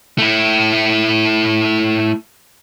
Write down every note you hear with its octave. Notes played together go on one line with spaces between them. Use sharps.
A3 E4